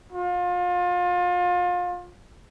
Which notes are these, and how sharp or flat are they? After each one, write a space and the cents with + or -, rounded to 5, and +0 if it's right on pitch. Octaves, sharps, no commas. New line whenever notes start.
F4 +30